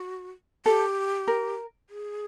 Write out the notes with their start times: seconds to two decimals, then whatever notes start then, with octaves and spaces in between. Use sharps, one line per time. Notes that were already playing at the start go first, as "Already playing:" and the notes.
Already playing: F#4
0.66 G4 A4
1.28 A#4
1.90 G#4